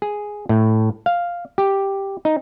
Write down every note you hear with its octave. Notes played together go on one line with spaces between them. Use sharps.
G#4
A2
F5
G4
D#4